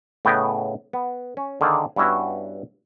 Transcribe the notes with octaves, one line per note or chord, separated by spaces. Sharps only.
A2 C#3 B3 G#4 D#5 G5
B3
C#4
D3 D#3 A#3 G#4 C5 D5
G2 B3 C#4 E4 F#4